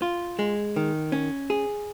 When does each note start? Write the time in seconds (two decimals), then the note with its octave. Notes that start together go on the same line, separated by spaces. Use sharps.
0.02 F4
0.39 G#3
0.76 D#3
1.12 C#4
1.50 G#4